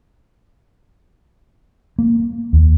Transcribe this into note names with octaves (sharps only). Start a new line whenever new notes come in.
A#3
D#2